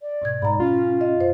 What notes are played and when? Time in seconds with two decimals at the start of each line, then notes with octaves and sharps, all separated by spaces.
0.02 D5
0.22 G#2 B2 G#6
0.42 G#2 A#5 B5
0.60 C#4 F4
1.01 D#5
1.16 F#2 C5